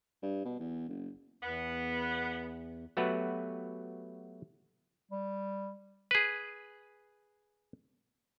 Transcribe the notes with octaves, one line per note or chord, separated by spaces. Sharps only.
G2
B2
E2
F#1
E2 B3
F#3 A3 B3 F#4 G4 B4
G3
G#4 B4